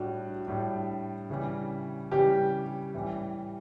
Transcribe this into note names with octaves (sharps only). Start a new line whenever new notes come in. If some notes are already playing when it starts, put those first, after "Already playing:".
Already playing: A2 G3 D4 F#4
A2 G3 D4
C#3 E3 G3
C#3 E3 G3 G4
A2 E3 G3